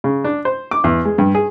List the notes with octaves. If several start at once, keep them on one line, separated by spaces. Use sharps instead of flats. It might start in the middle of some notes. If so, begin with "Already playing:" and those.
C#3
D4
C5
D6
E2
G#3
G2
G#4